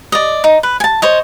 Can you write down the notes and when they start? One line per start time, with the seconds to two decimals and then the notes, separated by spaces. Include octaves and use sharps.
0.12 D5 D#5
0.44 D#4
0.63 B4
0.80 G#5 A5
1.02 C5 C#5 D#5